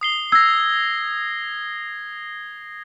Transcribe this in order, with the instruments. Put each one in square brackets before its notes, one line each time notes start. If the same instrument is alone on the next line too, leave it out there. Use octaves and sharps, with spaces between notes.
[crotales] D#6 C7 G7
[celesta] E6 [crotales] G#6 A#6